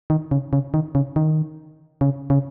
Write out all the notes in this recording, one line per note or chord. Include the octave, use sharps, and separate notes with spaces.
D#3
C#3
C#3
D#3
C#3
D#3
C#3
C#3